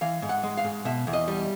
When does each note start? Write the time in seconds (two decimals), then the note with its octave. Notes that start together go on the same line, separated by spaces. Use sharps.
0.01 E3 F5
0.22 G#2
0.29 F#5
0.43 G#3
0.57 F5
0.64 G#2
0.85 B2 E5
1.07 E2
1.13 D#5
1.28 G3